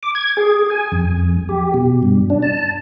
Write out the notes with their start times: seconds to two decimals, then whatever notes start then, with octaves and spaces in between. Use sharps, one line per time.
0.03 D6
0.15 G#6
0.37 G#4
0.70 G#5
0.92 F2
1.49 G4
1.74 B2
2.03 G2
2.30 D4
2.42 A5